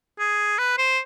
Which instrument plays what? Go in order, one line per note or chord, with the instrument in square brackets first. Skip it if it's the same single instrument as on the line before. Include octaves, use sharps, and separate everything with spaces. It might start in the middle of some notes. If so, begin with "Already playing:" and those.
[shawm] G#4
B4
C5